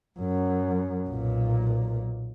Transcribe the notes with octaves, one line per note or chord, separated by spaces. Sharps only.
F#2
B1 A#2